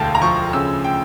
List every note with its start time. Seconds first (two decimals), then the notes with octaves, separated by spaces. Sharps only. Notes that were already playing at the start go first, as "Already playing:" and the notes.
Already playing: E1 D2 D3 F5 G5 A5
0.15 A#5
0.21 F3 C#6
0.53 C#3 E6
0.84 G5